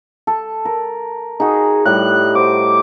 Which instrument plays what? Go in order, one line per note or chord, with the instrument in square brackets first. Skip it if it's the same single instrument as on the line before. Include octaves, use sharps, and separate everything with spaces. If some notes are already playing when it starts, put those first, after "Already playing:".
[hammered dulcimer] A4
A#4
[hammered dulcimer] D#4 F#4 [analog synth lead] G#4
[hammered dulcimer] A2 G3 [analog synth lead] F#6
[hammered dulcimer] F#4 C5 [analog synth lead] D6